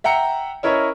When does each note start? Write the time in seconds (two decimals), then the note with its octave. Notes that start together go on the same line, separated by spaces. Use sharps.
0.04 E5 F#5 G5 A#5 C#7
0.63 C#4 E4 A#4 C#5 D#5